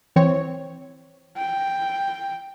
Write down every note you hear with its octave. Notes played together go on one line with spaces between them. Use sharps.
E3 C4 C#5
G5